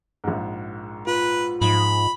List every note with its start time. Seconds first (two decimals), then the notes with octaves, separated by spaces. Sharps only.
0.24 A#1 G#2
1.07 F4 B4
1.61 G#2 F3 B5